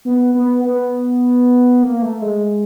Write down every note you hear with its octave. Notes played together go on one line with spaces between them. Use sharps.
B3
B3
B3
A#3
A3
G#3